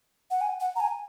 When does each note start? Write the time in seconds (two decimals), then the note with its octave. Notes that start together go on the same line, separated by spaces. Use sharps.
0.31 F#5
0.41 G#5
0.60 F#5
0.76 A#5
0.80 G#5